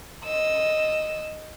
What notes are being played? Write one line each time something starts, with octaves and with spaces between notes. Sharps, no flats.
D#5 E6